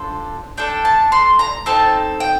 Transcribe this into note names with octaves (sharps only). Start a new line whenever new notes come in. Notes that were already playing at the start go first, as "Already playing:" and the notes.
Already playing: D4 F4 A4 C5
D4 A4 G5
A5
C6
A#5
C4 D#4 A4 A5
G5